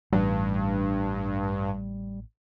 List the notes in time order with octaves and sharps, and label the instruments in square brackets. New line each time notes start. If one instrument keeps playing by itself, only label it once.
[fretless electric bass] A1 [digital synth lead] G2 [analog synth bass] G3